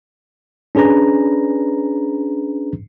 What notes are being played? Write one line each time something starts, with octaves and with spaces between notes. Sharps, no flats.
C#4 D4 G#4 B4 A#5